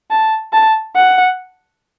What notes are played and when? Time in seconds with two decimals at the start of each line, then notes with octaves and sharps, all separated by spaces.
0.11 A5
0.53 A5
0.96 F#5